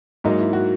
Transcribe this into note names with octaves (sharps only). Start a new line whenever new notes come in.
G#2 F#3 A#3 D#4
E4
F#4